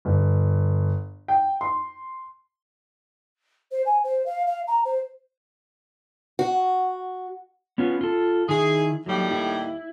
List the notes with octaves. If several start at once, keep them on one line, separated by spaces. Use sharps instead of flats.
G1
G5
C6
C5
G#5
C5
F5
F5
A#5
C5
F#4
B3 C#4 F4
F4 A4
D#3 E4 G#4
D#2 A2 F#3 G3
E4